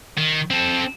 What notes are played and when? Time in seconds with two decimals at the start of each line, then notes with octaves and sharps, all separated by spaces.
0.18 D#3
0.50 C4 A4